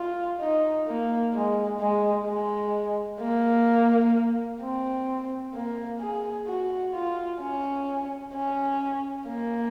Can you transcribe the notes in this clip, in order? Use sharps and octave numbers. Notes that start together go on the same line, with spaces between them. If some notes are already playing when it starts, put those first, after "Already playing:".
Already playing: F4
D#4
A#3
G#3
G#3
G#3
A#3
C4
A#3
G#4
F#4
F4
C#4
C#4
A#3